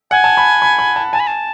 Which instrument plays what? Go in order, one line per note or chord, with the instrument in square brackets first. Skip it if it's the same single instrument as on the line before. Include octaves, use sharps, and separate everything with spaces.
[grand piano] F#5 [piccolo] G#5
[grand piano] A5
B5
B5
B5
A5
[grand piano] G#5 [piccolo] A5
[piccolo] B5
A5